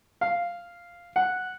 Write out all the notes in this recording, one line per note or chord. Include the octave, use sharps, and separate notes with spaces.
F5
F#5